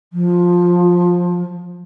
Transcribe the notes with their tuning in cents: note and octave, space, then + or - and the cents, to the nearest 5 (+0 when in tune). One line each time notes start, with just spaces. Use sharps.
F3 +10